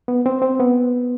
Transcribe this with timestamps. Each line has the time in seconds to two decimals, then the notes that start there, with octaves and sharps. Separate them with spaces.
0.08 B3
0.26 C4
0.42 C4
0.59 B3